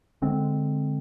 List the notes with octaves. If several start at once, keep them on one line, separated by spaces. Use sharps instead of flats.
D3 G#3 C4